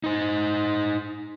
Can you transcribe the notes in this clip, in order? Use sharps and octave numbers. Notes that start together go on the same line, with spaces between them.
D#4 C5